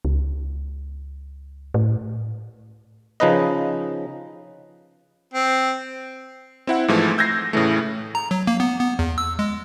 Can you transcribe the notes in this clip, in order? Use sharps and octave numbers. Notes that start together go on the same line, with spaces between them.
C#2
A2
C#3 F3 D#4 B4 D#5
C4
C4 E4 F#5
G#2 E3 F3 A3
E6 G6 G#6 A#6 C7
A2 C#3 E3 A3
A#5
F#3
A#3
B3
B3
E2
E6
G#3